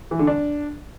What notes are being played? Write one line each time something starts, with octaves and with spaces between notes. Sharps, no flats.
E3
D3
D4